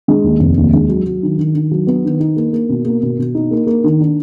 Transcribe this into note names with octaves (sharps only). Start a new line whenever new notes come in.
G#3
D#2
F1
D#2
G#3
F#3
F#3
D#3
D#3
D#3
F#3
B3
D#3
D#4
A#3
A#3
B2
A#3
B2
B2
D#4
A#3
A#3
D#3
D4